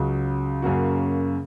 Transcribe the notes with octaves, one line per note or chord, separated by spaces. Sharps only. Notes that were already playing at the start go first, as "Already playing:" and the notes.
Already playing: C#2 C#3 F#3
F#2 C#3 A#3 F#4